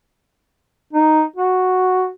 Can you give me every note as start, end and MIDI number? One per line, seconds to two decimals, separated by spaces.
0.93 1.23 63
1.36 2.09 66